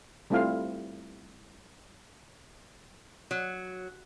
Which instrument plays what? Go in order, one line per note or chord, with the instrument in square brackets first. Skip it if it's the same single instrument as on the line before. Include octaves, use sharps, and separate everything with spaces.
[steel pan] G3 A3 C4 E4 F4 F5
[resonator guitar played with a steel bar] F#3